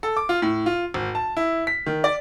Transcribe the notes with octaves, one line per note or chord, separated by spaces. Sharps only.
A4
D6
F4
A2
F4
G#1
A5
E4
B6
D#3
D5